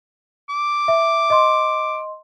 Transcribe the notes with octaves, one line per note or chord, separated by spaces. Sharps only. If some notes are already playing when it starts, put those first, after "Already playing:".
D6
E5
D#5 C6